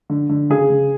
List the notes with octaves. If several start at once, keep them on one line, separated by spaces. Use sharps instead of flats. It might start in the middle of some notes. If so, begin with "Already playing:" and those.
D3
D3
C#3 G#4
C#3